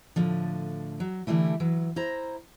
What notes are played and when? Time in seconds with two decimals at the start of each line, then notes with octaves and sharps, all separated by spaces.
0.16 A2 D3 F3
1.00 F#3
1.27 D3 E3 G3 A3 E4
1.60 E3 F#3
1.96 E4 C5 A#5